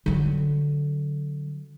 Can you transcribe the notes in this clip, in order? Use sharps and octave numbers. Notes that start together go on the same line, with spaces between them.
D3 F#3